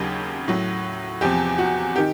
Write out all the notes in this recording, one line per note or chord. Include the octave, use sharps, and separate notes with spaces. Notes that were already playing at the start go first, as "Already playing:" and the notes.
Already playing: D#2 C#3 F#3 G4
A2 F#3
E2 C3 F3 G4
F#4
D#3 G4